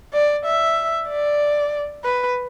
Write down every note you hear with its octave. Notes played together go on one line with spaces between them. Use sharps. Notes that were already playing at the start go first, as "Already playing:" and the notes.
D5
E5
D5
B4